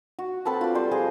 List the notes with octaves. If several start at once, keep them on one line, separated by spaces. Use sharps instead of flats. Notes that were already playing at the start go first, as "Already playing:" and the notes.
F#4
C4 A4 B4 A5
F4 D5
G3 C5
F3 G#4 D#5